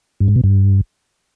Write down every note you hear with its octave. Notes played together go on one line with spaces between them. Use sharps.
G2
G#2
B2
G2